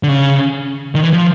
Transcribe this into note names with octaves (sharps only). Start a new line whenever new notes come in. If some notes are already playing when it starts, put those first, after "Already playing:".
D3
C#3
D#3
E3
F3